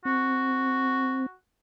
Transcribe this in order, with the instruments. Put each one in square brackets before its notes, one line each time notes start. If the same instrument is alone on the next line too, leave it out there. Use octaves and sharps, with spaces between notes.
[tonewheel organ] C4 [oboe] F#4